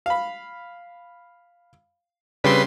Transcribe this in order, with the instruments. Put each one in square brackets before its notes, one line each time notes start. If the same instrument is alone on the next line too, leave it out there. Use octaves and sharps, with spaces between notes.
[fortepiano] F5 B5
[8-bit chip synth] C#3 G3 C6 [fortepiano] C4 D4 [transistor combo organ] B4